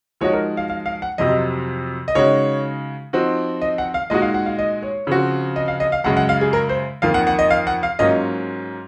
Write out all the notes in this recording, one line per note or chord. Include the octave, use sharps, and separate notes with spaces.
F3 G#3 D#4 F#4 C#5
A#4
F5
F5
F5
F#5
F2 C3 F#3 D#5
D#5
C#3 G#3 D#4 F#4 C#5
F3 C4 D#4 F#4
D#5
F#5
F5
A#2 G#3 D#4 F#4 D#5
F5
F#5
F5
D#5
C#5
C#3 F3 C4 F#4
D#5
F5
D#5
F5
F#2 C#3 G#3 F#5
F#5
F5
G#4
A#4
C5
F2 D#3 A#3 F5
F#5
F#5
D#5
F5
F#5
F5
G#2 F#3 A#3 C#4 F4 D#5